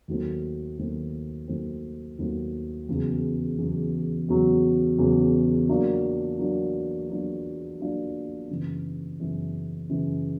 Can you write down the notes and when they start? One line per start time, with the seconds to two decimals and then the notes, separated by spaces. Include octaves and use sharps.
0.08 D#2 D#3 F#3 A3 C4
0.79 D#2 D#3 F#3 A3 C4
1.48 D#2 D#3 F#3 A3 C4
2.18 D#2 D#3 F#3 A3 C4
2.89 E2 C#3 F#3
3.58 E2 C#3 F#3
4.29 E2 C#3 F#3
4.98 E2 C#3 F#3
5.69 F#3 A#3 D4 F4
6.39 F#3 A#3 D4 F4
7.10 F#3 A#3 D4 F4
7.79 F#3 A#3 D4 F4
8.50 F#2 C#3 E3
9.20 F#2 C#3 E3
9.89 F#2 C#3 E3